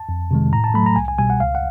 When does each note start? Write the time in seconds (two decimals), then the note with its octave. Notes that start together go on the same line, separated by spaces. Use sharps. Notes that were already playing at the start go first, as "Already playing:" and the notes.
Already playing: A5
0.09 F2
0.31 C3 D#3 G#3
0.52 A2 A#5
0.64 A5
0.74 F#3 A3 B5
0.86 A#5
0.96 C2 G#5
1.08 G#5
1.18 B2 G3 G#5
1.30 F#5
1.40 C#2 F5
1.55 F#5